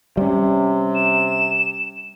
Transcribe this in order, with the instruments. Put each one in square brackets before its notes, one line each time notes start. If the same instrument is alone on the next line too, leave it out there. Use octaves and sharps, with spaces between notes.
[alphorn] C3 [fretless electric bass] G3 G#3 C#4
[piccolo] E7